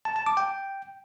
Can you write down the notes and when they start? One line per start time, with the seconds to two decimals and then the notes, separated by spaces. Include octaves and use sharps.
0.05 A5
0.16 A5
0.26 D6
0.37 G5